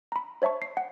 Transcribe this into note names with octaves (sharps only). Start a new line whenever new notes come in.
A#5 B5
C5 C#5 E5 A5 C#6
C7
F#5